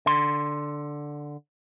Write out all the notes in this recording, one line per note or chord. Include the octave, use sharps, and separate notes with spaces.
D3 C6